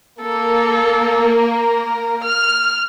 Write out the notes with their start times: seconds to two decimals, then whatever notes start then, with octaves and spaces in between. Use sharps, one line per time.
0.22 A#3 A4
1.57 A#4
2.24 F6